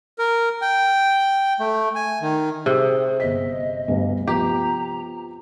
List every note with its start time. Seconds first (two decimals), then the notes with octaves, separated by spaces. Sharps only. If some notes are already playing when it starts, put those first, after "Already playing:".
0.18 A#4
0.61 G5
1.60 A3
1.95 G#5
2.22 D#3
2.66 C3 G#4
3.20 G1 D#5 B6
3.88 D2 G2 B3
4.27 F3 B3 G4 A#5